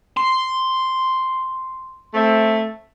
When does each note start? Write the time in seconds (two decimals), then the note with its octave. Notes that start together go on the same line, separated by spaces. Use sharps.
0.17 C6
2.14 A3 C4 E5